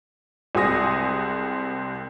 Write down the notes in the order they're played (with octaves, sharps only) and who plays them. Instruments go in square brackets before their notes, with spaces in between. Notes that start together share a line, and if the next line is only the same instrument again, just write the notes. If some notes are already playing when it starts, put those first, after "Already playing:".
[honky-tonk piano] C2 C3 G#3 G#5 D#6 A#6